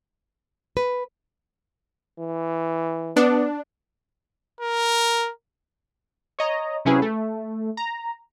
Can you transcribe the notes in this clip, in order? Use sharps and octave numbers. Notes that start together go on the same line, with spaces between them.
B4
E3
B3 D4
A#4
C#5 D#5 A#5
C3 F#3 C#4 E4 G#4 B4
A3
A#5